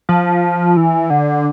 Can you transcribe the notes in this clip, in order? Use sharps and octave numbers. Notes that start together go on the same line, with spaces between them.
F3
E3
D3